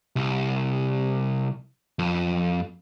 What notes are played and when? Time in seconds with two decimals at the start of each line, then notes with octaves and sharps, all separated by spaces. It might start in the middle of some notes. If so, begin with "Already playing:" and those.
0.16 C2
1.99 F2